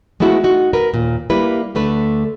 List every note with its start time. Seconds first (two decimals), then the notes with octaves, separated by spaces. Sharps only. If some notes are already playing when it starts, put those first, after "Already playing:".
0.20 G#3 A3 B3 E4 F#4
0.44 D#4 F#4
0.73 A#4 B4
0.94 D#2 A#2
1.30 G3 A#3 E4 B4
1.75 D2 D3 A3 B4